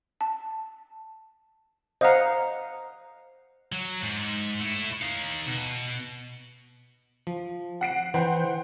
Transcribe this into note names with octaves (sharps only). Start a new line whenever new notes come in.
A5
C5 D#5 F5 F#5 A#5
F#3
G#2
A3 E4
D#4 F5
B2
F3
F#5 C7 D7
E3 C5 F#5 G5